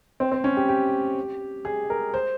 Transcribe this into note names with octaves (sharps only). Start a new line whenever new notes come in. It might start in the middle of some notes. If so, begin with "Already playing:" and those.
C4
C4
C#4
G4
G4
G#4
A#4
C5